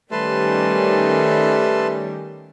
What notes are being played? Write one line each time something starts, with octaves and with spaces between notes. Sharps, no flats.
D#3 G3 A3 C#4 B4 A5 C6